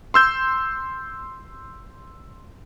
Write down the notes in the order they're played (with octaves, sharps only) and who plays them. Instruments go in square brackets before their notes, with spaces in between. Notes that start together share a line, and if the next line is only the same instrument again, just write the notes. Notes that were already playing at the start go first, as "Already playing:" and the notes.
[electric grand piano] C6 E6 G6